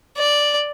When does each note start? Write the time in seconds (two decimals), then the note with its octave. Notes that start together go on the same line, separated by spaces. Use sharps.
0.17 D5